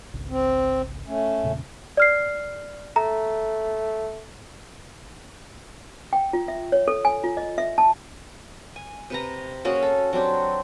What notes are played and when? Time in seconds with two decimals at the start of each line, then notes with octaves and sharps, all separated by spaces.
0.14 G#1 C#2
0.30 C4
1.07 A3 C#4
1.43 E2 A#2 C#3
1.97 D5 F6 C7
2.96 A3 A#5
6.13 G5
6.33 F4
6.48 E5
6.72 C#5
6.88 A4
7.05 G#5
7.24 F4
7.37 D#5
7.58 E5
7.78 A5
8.76 G#5
9.10 C3 B4 A#5
9.65 A#3 C#4 F#4 G#4
9.82 A4
10.13 F#3 C4 D4 G4